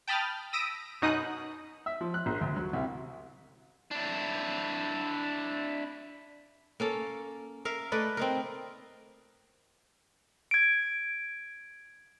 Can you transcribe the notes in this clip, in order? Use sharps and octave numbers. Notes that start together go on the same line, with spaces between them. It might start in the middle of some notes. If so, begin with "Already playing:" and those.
G5 A5 B5 D#6 F6 A6
D#6 E6 A#6 B6 D7 D#7
F#2 B2 D#4 D#6 F#6
E5
F3
F#6
A#1
D2
F#3
C2
D4 E4
A#3 C#4 A4
A#4 E5 F5
A3 B4 D5 D#5
C4 D#4 A#4
G#6 D7